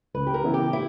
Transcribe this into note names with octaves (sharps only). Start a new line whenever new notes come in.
C#2 B4
G4
A#4
C#3 E3 B3 E4
G4
E4